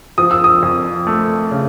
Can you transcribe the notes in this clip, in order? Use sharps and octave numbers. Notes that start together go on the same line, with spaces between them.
F3 D#6
E6
D#6
F2
A3
C#3